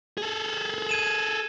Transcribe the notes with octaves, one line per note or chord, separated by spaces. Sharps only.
G#4 A4
G#6 D#7 E7